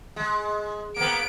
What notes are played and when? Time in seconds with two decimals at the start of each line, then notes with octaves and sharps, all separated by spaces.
0.16 G#3
0.96 A#3 B3 D7